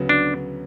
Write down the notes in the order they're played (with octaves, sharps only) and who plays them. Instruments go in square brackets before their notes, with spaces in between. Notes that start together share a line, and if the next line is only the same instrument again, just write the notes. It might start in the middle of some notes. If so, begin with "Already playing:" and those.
Already playing: [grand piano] D2 C#3 F#3 B3
[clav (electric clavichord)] D4